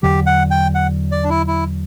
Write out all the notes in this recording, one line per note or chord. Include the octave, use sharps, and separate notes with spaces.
E2 D3 F#3 G4
F#5
G5
F#5
D5
D4
E4
E4